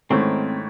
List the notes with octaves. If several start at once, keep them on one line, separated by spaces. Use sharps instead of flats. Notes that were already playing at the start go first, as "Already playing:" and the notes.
G#2 D#3 A3 C4 C#4 E4